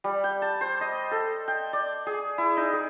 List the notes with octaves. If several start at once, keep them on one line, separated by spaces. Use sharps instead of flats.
G3
G5
A5
C5
D#5
A4
G5
D5
G#4
E4
D#4
G#4